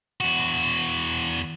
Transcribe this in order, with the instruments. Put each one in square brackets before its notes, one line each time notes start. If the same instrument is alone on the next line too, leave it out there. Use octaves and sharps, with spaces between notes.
[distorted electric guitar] E2 F#4